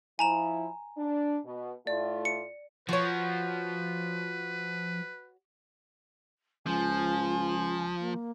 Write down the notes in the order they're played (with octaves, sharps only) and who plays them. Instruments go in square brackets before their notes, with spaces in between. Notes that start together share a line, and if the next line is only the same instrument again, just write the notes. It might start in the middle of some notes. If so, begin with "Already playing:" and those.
[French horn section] F3 E4 [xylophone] G#5 A#5 E7
[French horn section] D4
B2
[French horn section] A2 A3 F4 [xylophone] D5
[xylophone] C#7
[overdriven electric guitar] F3 [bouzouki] F#4 C#5 [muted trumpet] B4
[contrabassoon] C#2 [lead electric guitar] F3 [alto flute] G#5
[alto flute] A#3